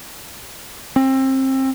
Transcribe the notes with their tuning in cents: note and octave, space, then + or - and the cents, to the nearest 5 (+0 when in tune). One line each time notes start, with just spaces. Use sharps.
C4 +25